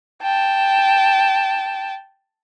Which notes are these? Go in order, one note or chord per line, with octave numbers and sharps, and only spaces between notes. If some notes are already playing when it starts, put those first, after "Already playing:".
G5 A5